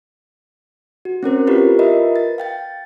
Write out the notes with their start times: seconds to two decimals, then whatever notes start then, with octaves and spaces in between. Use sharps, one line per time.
1.05 F#4
1.23 C4 C#4 A#4 C5
1.47 E4 F4 G4 A#4 B4
1.79 F4 A#4 B4 D#5 E5
2.16 A6
2.38 F5 G5 A6